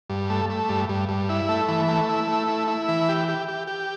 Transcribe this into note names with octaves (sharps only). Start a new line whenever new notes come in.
G2
A3
A3
G2
G2
G2
E4
A3
E3
A3
E4
A3
E4
E4
E3
G4
G4
G4
G4